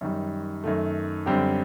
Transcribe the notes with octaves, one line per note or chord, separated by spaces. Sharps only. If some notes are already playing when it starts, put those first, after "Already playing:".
F#2 D#3 G3
F#2 D#3 A3
F#2 D3 G3 C4 G4